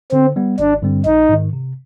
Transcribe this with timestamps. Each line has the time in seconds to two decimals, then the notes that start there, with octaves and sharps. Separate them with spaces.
0.12 D3 C4
0.36 G3 B3
0.59 G#1 D4
0.82 G2 D3 G3 C4
1.05 A#1 D#4
1.29 G#2 D#3
1.53 C3